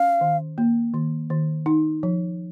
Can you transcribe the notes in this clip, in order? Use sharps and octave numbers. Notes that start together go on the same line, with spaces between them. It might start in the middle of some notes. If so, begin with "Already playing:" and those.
Already playing: C#4 F5
D#3
A#3
D#3
D#3
D#4
F3